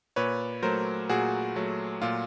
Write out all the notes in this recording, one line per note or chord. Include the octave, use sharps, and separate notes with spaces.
A#2 B4 C#5
F#3 A3 A#4 C5
A#2 F#4 G#4
F#3 A3
A#2 F4